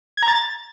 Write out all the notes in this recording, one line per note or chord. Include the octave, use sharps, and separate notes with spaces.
G#6
A#5
A6